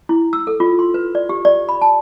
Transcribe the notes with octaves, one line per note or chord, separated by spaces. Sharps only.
E4
E6
A4
F4
C6
B4
D5
G4
D5
B5
A5